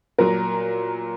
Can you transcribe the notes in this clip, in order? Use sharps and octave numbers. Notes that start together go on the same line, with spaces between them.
A#2 F#3 A#4